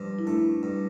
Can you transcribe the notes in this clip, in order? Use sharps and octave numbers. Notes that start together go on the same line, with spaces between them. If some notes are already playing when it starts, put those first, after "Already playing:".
Already playing: G2 F3
E4
A3 D4
G2